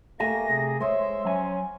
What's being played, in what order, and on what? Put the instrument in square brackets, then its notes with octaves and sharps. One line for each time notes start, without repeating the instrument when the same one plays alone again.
[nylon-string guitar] A3 G4 [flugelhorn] A#3 [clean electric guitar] E5 G#5 [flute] A#6
[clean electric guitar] C3 [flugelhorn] G#4
[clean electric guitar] G#3 [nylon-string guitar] C5 C#5 [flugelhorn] E5 [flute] C6
[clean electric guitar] F#3 G#5 [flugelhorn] C#4